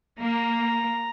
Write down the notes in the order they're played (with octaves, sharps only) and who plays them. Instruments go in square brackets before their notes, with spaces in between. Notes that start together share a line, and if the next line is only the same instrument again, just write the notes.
[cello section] A#3 [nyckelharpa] A#5